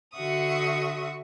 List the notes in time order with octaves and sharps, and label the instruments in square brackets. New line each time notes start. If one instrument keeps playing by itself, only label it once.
[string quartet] D3 F#4 E5 C#6 D#6